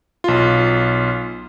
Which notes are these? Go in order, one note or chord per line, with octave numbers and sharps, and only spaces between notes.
B1 F4